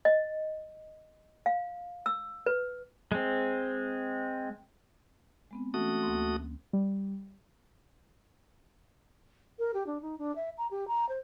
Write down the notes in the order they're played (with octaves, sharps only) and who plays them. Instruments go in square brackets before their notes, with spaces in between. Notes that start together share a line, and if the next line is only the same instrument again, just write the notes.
[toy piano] D#5
F5
E6
B4
[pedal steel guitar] G#3 C4
[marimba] G#3 B3 C4
[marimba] E3 C#4 [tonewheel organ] A3 F#4 D#6
[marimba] D2 A#3 C6
[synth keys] G3
[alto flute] A#4
G4
D4
D#4
D4
E5
A#5
G4
A#5
C5